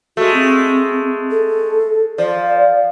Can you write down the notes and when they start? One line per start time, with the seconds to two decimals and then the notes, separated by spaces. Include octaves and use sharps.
0.17 G#3 A3 F#4
0.34 C4
1.31 A4
2.18 F3 D5